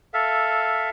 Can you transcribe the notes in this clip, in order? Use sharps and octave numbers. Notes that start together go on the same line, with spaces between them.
A4 E5 F5